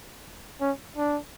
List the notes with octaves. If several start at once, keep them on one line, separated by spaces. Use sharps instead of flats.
C#4
D4